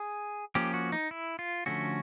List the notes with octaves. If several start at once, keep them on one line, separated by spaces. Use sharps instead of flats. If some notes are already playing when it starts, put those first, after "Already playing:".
Already playing: G#4
F3 A#3 C#4 G4
F#4
D#4
E4
F4
D3 F3 A3 C#4 F#4